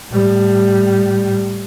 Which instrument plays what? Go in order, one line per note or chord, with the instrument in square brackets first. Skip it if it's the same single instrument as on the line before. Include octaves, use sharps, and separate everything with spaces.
[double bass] A2 G3